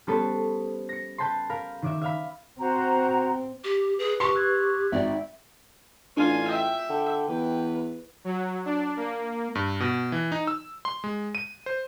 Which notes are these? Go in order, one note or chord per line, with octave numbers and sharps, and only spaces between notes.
G3 B3 C#4 A4 B4 C5
A#6 C#7
B4 G5 A5 B5 C6
A#4 F5 B5
D#3 D5 E5
E5 F5 B5
C4 F#4 C5 A#5
G4
G#4 B4
G4 C6 C#6
E6 F#6 G#6
G#1 D#4 D5 E5 G5
A1 D4 F4 G#5
E5 G5
D3 G5
E2 B4
F#3
D4
A#3
G2
B2
E3
D#4
E6
C6
G#3
D#7
C5